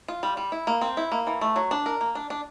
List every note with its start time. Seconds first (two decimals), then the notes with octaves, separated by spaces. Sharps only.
0.08 F4
0.23 G3
0.37 G3
0.52 E4
0.67 A#3
0.81 C4
0.97 E4
1.12 A#3
1.27 E3
1.41 A3
1.56 F#3
1.71 D4
1.86 A#4
2.01 A#3
2.15 D4
2.30 D4